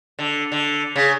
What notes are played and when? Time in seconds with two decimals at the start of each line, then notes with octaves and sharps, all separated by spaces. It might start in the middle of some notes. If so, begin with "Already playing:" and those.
0.19 D3
0.52 D3
0.96 C#3